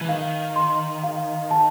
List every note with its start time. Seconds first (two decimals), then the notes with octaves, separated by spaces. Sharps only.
0.01 E3
0.09 D#3 F5
0.56 C6
1.04 F5
1.51 A5